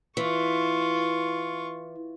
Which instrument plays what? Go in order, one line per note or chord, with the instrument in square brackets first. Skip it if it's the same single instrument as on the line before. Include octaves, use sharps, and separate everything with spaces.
[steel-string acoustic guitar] E3 [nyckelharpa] F4 C#6